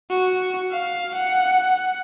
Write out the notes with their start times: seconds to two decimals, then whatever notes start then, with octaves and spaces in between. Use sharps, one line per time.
0.10 F#4
0.72 F5
1.16 F#5